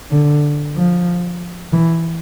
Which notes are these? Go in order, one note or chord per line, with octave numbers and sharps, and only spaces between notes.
D3
F3
E3